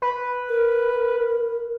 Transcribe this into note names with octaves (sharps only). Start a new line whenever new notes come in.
B4
A#4